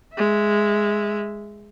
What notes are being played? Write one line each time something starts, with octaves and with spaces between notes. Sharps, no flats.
G#3 E5